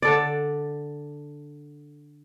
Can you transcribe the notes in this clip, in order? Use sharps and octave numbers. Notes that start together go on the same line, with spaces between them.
D3 A4 D5